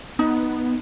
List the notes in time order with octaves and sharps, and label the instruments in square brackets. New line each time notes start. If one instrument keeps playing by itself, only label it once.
[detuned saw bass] B3 [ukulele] D#4